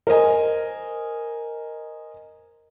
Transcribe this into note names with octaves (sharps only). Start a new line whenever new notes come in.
A#4 C5 D#5 G#5